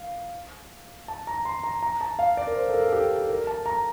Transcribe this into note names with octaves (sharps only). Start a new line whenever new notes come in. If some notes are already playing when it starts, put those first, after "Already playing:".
Already playing: F5
A5
A#5
C6
A#5
A#5
A5
F5
D5
A#4
C5
A4
A#4
A4
G4
A4
A#4
A5
A#5